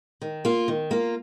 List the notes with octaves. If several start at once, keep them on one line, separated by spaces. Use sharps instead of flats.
D#3
A#3 F4
D#3
A#3 F4